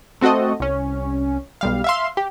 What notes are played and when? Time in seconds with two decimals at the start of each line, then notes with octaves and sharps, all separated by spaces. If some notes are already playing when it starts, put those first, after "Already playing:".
0.21 A3 C4 F#4 A4 D#5
0.60 C2 C#4
1.61 B1 G3 F5
1.84 E5 F5 C6
2.17 G4